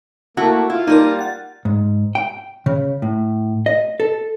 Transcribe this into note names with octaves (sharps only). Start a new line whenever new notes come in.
A3 A#3 E4 F#4
E4 F4
G3 A#3 D#4 A#4
F#5 A6
G#2
G5
C#3
A2
D#5
A4